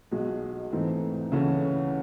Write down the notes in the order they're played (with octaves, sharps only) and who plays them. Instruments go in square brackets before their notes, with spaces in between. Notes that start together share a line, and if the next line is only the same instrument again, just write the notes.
[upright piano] B1 B2 G#3
G#2 E3 A3 C4
D2 C#3 E3 A3 C#4